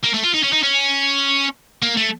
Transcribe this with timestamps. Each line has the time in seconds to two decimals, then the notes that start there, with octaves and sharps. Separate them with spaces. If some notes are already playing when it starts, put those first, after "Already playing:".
0.03 A#3
0.14 A3
0.24 F4
0.34 D#4
0.44 C#4
0.53 D#4
0.63 C#4
1.82 A#3
1.97 A3